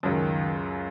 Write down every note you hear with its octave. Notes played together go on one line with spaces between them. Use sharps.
C#2 F#2 D#3